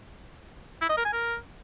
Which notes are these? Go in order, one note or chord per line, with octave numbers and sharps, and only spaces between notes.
E4
D#5
A#4
G#5
A#4